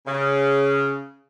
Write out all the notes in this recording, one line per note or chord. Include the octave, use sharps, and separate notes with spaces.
C#3